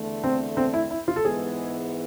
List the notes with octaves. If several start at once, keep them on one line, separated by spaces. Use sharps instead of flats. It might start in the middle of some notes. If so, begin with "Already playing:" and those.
Already playing: E2 D3 A3
C4
C4
E4
E4
F4
A4
G#2 E3 G#3 B3 G#4